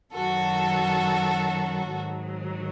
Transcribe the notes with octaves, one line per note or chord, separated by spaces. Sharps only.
F#2 D#3 F#3 F#4 A4
G#2 D#3 F#3